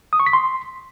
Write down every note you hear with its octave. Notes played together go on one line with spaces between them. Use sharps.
D#6
C#6
B6
C6